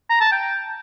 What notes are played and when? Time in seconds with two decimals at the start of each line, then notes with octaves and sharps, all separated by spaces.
0.09 A#5
0.21 A5
0.32 G5